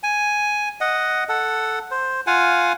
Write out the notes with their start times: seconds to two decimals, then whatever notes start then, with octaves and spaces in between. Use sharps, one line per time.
0.03 G#5
0.81 D#5 F#5
1.29 A4 F#5
1.91 C5
2.27 F4 F5 F#5 G#5